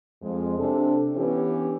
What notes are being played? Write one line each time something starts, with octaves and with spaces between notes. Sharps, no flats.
F2 G#3
C3 D4 A4
E3 B3 C#4 D4 E4 G4